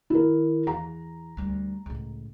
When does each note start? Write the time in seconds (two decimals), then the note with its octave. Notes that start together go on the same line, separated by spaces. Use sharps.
0.10 D#3 E4 A#4
0.67 E2 A#5
1.37 D2 G3
1.86 C#2 A2